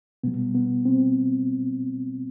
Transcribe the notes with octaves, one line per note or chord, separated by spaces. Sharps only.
B2 G3 B3
B3
C4